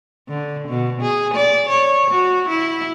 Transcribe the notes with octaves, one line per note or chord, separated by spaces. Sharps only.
D3
B2
G#4
D5
C#5
F#4
E4